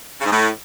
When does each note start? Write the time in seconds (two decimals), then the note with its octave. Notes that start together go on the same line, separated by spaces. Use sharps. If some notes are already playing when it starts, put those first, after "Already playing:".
0.20 C#3
0.26 G#2
0.31 A2